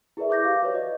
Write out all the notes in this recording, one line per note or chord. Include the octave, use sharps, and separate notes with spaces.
E4 G#4 A#4 B4 D5 E5
C#6 D6 G6 A#6
G4 F5
F#4 B4 C#5 D5
D#5